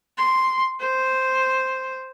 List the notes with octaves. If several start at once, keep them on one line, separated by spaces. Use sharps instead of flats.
C6
C5